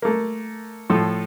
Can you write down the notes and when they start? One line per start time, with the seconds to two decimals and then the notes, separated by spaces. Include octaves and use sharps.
0.02 A3 A#3
0.90 A2 F3 A4